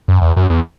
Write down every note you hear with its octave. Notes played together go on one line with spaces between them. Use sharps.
F#2
E2
F#2
E2